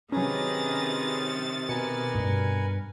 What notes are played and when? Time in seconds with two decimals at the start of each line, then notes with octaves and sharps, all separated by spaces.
0.12 C3 D#3 F#3 C#4 G#4 B4 A#5 A6
1.69 B2 A#4 B4 G#5 C#7
2.15 G2